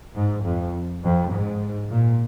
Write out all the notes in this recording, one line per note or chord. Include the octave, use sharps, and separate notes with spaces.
G#2
F2
F2
G#2
A#2